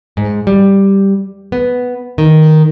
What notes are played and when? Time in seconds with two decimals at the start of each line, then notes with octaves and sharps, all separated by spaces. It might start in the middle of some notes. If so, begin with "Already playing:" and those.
0.17 G#2
0.47 G3
1.52 B3
2.18 D#3